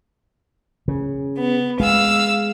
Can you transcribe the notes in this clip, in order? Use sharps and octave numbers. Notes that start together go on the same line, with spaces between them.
C#3
B3
G#3 F5 E6